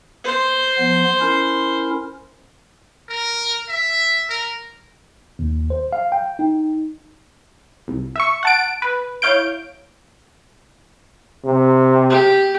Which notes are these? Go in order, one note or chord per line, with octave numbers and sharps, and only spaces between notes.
C5 C6
F3 B3
C#4 E4 A#4
A#4
E5
A#4
D#2
C5
F5
G5
D#4
C2
E5 C#6
F#5 A5 D7
B4
E4 C#5 F5 G6 D7
C3
G4